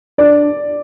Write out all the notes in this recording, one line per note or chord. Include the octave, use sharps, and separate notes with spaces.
D4 D5